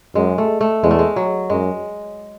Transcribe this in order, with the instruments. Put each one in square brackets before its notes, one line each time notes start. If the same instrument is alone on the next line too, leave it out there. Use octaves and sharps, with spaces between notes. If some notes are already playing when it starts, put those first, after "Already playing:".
[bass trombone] F#2 [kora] G#3
[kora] A3
A3
[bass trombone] E2 [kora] G#3
[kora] A3
G#3
F#3
[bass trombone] F#2 [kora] G#3